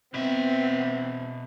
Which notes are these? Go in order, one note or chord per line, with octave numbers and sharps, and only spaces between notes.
B2 B3 C4 E5